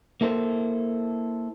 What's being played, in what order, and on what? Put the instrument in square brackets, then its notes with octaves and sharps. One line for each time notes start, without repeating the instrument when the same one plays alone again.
[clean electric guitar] A#3 E4 A4 C5